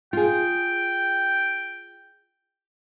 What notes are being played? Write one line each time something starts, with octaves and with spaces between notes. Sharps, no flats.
F4 G#4 G5